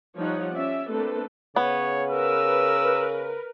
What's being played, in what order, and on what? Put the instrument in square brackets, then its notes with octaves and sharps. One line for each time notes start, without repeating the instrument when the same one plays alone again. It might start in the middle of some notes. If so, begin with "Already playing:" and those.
[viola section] F3 G3 D#4 C#5 F#5
C#4 D5 E5
A3 A#3 C4 D4 A4 B4
[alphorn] C#3 [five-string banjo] B3 [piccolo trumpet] C#5
[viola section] A#4 B4 [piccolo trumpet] E6